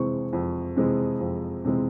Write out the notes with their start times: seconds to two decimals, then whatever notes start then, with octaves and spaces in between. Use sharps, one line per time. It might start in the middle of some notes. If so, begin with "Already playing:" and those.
Already playing: F2 C3 E3 G#3 C4 C#6
0.33 F2
0.77 C3 E3 G#3 C4
1.20 F2
1.65 C3 E3 G#3 C4